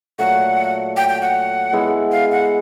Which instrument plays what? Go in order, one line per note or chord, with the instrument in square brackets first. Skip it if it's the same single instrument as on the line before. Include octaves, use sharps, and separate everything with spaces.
[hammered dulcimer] A#2 F#3 A3 [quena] F#5
[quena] G5
G5
F#5
[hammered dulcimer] G#3 B3 E4
[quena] F5
F#5